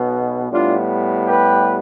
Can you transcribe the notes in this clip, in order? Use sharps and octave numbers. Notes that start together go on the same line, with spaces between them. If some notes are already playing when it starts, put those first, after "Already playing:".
Already playing: B1 B2 B3
A2 G3 B3 D4 F4
G4 B4